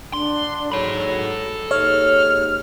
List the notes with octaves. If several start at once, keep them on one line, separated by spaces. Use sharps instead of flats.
D3 D4 C6
G#2 F#3 A4 B5
D#2 G#2 C#5 F6